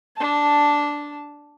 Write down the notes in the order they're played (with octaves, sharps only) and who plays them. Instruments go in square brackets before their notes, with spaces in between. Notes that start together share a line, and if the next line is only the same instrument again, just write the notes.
[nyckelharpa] D4 A5